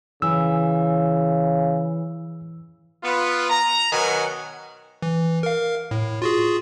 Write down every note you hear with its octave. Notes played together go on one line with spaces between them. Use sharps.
C#3 E3 E6
B3 F4 B4
A#5
B2 D#3 F#3 B3 F#5 G#5
E3
A#4 F5
A2
F4 F#4 G#4